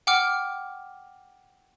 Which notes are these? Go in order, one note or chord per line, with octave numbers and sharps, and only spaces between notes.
F#5 G5 D6 F6